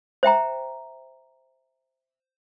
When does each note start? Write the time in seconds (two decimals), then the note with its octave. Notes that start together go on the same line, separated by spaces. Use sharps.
0.23 C5 E5 G5 A#5